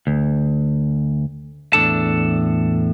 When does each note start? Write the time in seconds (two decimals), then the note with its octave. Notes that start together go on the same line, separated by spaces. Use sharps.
0.07 D2
1.73 E2 A2 F3 D4 A4 A5